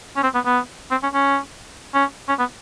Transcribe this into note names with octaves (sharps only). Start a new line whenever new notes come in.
C#4
C4
B3
B3
C4
C#4
C#4
C#4
C#4
B3